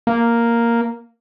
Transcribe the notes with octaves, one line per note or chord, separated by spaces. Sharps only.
A#3